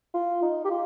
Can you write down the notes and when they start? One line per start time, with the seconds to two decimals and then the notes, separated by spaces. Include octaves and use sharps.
0.14 F4
0.42 D#4
0.65 G4
0.70 F4